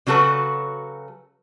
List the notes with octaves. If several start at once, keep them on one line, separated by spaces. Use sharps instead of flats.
C#3 F#3 F#4 A4 B4